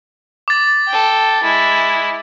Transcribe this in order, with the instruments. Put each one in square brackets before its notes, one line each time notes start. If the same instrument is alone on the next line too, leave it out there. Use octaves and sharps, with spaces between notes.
[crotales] D6 A6
[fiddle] A4 G5
G#3 E4